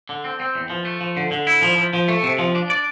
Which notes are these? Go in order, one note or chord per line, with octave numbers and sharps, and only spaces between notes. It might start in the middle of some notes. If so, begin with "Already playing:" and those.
D3
C4
C4
E2
F3
A3
F3
D3
D3
E4
F3
F3
F3
A3
C3
F3
D4
D5